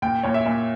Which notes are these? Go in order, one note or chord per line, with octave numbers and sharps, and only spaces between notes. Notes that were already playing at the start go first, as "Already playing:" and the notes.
A#2 G5
A#2 C#5
E5
A#2